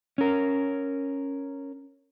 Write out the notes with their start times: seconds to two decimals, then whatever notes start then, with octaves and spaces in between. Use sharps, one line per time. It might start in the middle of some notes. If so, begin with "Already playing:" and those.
0.18 C#4 A#4